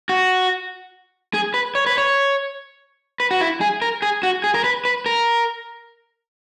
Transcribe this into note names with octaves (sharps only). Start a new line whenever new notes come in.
F#4
G#4
B4
C#5
B4
C#5
B4
F#4
E4
G#4
A#4
G#4
F#4
G#4
A#4
B4
B4
A#4